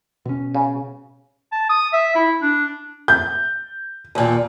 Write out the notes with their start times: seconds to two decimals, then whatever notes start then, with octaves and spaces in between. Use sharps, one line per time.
0.25 B2 C#4
0.55 C#3
1.52 A5
1.69 D#6
1.93 E5
2.15 E4
2.42 D4
3.08 G6
4.15 D#2 A#2